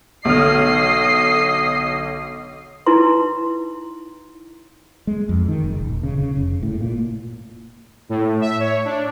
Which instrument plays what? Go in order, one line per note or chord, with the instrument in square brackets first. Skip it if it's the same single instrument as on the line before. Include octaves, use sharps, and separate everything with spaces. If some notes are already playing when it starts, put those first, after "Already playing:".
[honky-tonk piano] B1 D3 F6 [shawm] D#5 [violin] C7
[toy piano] D#4 E4 B4 A#5 C6
[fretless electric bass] G#3
F2
D#3
F#1
D#1
C#3
C#3
F1
A2
A#2
[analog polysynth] A2
E5
C#5
D4